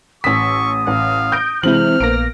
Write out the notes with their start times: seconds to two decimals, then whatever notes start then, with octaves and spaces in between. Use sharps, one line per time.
0.24 A1 C#6 D#6 E6 B6
0.87 A1 F5
1.32 G6 A#6 D7
1.63 C3 E3 G#3 E4 C5 F6 F#7
2.00 A#1 A#3 B3 A#6 D7